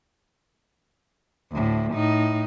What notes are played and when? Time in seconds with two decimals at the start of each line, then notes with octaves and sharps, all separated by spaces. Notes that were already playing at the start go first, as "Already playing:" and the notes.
1.52 D2 A2
1.93 A2 D#4